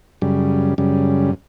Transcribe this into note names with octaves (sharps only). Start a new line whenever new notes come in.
F#2 C#3 G3
F#2 C#3 G3